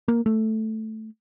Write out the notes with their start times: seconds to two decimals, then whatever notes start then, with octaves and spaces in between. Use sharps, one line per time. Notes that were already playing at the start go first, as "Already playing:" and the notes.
0.08 A#3
0.26 A3